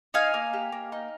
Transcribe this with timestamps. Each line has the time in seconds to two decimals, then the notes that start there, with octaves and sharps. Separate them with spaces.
0.14 D#4 F5 G#5
0.34 A#3
0.53 G4
0.72 A#3
0.92 D#4